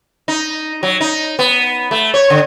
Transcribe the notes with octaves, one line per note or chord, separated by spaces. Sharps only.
D#4
F#3
D#4
B3
A3
C#5
D3